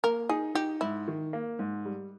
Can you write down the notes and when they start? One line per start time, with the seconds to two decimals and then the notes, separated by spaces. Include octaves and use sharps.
0.04 A#3 A#4
0.29 D#4 G#4
0.55 D#4 G4
0.81 G#2 E4
1.08 D#3
1.33 A#3
1.59 G#2
1.85 G3